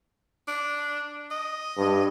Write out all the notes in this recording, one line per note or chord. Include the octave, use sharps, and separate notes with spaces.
D4
D#5
G2